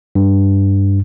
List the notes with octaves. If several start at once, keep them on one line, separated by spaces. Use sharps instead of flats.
G2